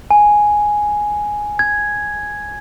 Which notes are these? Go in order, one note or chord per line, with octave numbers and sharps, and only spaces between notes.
G#5
G#6